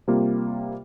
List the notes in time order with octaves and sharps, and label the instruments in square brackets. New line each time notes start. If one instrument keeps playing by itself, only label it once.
[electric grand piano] C3 G3 A#3 F4